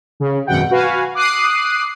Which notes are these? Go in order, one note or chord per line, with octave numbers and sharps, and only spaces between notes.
C#3
G#1 F#2 B2 F#5 G5
F#4 B4 F5 G#5
D6 D#6 F#6 C7 D#7